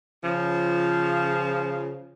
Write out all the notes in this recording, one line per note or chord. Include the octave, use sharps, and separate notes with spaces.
C#3 F3